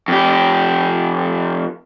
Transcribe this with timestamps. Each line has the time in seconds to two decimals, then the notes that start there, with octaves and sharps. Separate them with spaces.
0.08 F2 G4